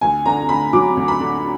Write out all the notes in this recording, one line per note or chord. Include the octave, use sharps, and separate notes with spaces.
D2 G#5
D3 A#5
D2 B5
F#3 D6
D2
B5
D3